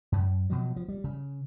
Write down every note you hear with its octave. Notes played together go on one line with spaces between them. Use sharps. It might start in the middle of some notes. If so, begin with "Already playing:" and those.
F#2
B2 F3 F#3
F3
G3
C#3